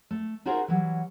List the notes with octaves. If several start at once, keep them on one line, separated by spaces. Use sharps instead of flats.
A3
D#4 F4 F#4 G#4 A#4 C5
E3 F#3 G3